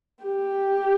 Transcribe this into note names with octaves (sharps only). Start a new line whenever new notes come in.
G4